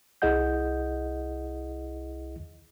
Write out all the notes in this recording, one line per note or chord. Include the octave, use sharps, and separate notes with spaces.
C2 E4 G#4 D#5 F#5 G6